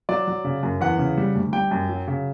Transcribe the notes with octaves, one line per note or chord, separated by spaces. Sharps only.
F#3 D5
F#3
C#3
F#2
E2 F#5
C#3
G3
D2
G3 G5
F#2
F#3
C#3